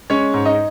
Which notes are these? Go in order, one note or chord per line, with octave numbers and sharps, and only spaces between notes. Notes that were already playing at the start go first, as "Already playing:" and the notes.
G#3 C#4 C#5
G#2
D#4 D#5